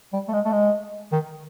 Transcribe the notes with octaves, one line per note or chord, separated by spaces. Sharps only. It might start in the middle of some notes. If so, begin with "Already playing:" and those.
G3
A3
G#3
A3
G#3
D#3